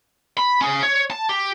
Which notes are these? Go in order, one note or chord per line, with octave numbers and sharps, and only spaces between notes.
B5
C#4 G#4
C#5
A5
G4